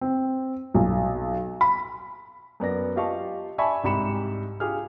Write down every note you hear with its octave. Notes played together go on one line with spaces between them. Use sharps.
C4
B1
B5
F#2 B3 D5 A#6
F4 G4 D#5 F5 A5 C#6
D5 E5 G#5 A5 B5 C#6
C2 G#2 G4 B5 C#7 E7
F4 G4 G#4 F6